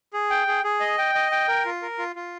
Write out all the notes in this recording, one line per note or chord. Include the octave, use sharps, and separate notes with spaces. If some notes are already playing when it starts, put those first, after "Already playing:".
G#4
G5
G#4
G#4
D#5
G5
D#5
G5
A#4
F4
A#4
F4
F4